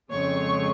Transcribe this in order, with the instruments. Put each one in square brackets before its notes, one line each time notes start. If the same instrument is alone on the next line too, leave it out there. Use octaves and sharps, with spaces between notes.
[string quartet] F2 C#3 G#3 C#5 C#6